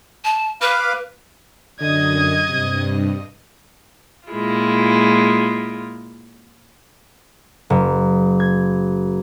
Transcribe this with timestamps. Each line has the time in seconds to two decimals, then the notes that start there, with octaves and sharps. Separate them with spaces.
0.24 A5
0.61 B4 F5 B5 D6
1.81 F#2 D3 D#5 G#6
2.49 G2 C3
4.28 A#2 G#3 E4 F4
7.70 F#1
8.40 G#6